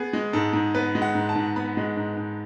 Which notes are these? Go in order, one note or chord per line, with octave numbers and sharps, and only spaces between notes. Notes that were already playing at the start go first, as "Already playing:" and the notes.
Already playing: B3 G#4
G#3
G#2 A4
G#2
B3 B4
G#3
F#5
G#2
A5
G#2
B3 B5
G#3
G#2
G#2